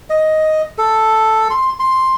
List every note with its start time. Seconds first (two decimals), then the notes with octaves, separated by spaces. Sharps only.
0.10 D#5
0.78 A4
1.50 C6
1.79 C6